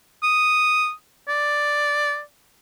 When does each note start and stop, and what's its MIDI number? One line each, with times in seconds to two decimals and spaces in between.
0.23 0.91 87
1.28 2.21 74